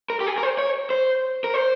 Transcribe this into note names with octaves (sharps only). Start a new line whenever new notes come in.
A#4
G4
G#4
A#4
C5
C#5
C5
A#4
C5